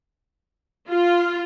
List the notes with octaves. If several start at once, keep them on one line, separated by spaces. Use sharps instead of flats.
F4